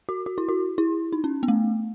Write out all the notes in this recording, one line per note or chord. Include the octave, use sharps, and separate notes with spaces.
F#4
F#4
E4
F#4
E4
D#4
C#4
B3
A3